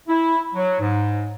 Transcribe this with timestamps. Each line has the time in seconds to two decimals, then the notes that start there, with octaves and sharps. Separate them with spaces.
0.08 E4
0.54 F#3
0.80 G#2